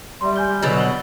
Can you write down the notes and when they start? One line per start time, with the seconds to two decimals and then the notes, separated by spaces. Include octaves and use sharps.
0.21 G3 E5 C6
0.36 G#5 G6 G7
0.48 G3
0.63 B2 D3 F#3
0.76 F#5 F#7 G7